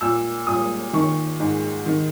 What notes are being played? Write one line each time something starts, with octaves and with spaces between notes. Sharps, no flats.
A#2 E6
A#2 D#6
D#3 C#6
G#2
D#3